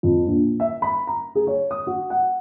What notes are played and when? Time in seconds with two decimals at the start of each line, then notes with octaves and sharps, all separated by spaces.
0.03 F2
0.27 A#1
0.60 E5
0.82 B5
1.07 A#5
1.35 G#4
1.47 C#5
1.71 D#6
1.87 F#4
2.10 F#5